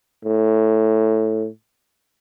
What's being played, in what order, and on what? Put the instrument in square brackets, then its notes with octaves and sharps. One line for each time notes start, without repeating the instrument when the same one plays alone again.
[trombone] A2